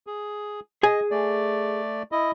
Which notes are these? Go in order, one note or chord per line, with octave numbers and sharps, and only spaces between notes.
G#4
G#4 D#5 G#5
A3 D5
E4 D#5